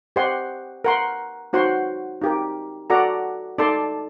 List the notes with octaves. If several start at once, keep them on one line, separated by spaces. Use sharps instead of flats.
G4 C5 D#5 F#5 C6
A#4 F#5 C6
D#4 F#4 C5 F#5 C6
D#4 G4 A#4
F#4 A4 D5 F#5 A#5
D#4 A4 D5 A5 C6